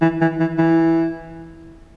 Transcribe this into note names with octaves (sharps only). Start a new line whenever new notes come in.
E3
E3
E3
E3